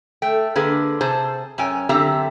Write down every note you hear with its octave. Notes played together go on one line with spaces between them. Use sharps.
A3 G5
D3 A#3 G#4 B4
C3 G#4 C5 A5
F#2 C#4 G5 G#5
F#2 D3 C4 G4 E5 A#5